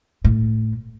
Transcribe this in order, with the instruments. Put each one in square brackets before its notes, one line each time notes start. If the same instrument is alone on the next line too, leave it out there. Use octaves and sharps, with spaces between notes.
[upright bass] A2